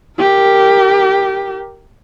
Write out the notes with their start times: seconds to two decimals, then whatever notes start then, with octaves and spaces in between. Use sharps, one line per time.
0.19 G4 A#4